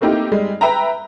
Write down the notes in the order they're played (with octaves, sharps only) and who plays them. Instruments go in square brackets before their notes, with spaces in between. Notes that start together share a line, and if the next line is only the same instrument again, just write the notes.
[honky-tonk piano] A3 A#3 C4 D#4 E4 G4
G3 G#3
B4 E5 G5 A#5